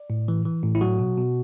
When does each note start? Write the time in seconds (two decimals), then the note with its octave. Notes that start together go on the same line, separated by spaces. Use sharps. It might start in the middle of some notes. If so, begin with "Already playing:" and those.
Already playing: D5
0.10 A2
0.28 E3
0.45 E3
0.64 A2
0.75 E4
0.81 F#3 F#4
0.99 B2
1.17 B2